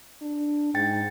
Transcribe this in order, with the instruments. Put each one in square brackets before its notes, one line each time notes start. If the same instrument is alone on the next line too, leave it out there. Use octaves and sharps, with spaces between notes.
[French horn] D4
[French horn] G#2 [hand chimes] G5 A6